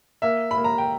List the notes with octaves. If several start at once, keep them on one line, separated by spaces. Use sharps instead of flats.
A#3 E5
B5
A#3
A#5
G5